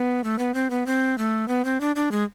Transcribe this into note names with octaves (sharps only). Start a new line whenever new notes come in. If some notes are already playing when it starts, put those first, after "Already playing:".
Already playing: B3
A3
B3
C4
B3
C4
A3
B3
C4
D4
D4
G#3